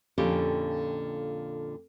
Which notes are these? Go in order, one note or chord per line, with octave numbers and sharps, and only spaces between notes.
F2 A#2 D3 C#4 G4